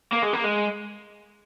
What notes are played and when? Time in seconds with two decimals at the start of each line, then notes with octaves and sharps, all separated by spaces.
0.13 A#3
0.23 G#3
0.33 A#3
0.44 G#3